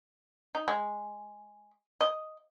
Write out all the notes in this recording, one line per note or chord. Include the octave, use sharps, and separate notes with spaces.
D#4
G#3
D#5